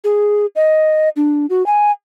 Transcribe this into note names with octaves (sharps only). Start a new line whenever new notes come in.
G#4
D#5
D4
F#4
G#5